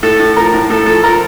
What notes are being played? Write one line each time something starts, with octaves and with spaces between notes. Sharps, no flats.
A2 A4
A2
F3 A#4
A2
A2 A4
F3 A4
F3 A#4